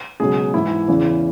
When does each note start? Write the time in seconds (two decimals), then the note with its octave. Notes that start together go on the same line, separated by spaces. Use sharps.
0.20 C#2 B2 F#3 G#4
0.54 G#2 E3 E4
0.88 E2 C#3 E3